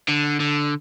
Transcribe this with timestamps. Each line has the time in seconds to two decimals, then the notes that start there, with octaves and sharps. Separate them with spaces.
0.08 D3
0.40 D3